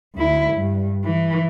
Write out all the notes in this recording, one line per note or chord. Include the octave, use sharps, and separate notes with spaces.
D2 E4
G2
E3